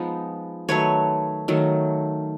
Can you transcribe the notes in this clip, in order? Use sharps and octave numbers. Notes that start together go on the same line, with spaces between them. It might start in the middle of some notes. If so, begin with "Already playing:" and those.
Already playing: F3 G#3 B3 D#4
D#3 F#3 A3 B4 C#5
D#3 F#3 A3